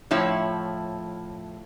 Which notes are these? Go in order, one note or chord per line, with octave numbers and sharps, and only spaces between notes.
A2 F3 E4 C#5